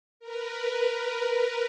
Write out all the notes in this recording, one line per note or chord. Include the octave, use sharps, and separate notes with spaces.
A#4 B4